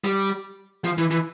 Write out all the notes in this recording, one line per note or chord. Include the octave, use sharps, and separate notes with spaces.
G3
F3
E3
E3